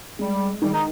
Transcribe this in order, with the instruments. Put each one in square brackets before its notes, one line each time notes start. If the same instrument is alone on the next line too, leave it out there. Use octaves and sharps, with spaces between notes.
[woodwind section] G3 [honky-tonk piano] G#3
[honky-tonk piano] D#3 [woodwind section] G3
[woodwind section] D#4